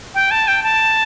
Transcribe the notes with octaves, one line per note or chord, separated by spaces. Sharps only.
G5
A5
G5
A5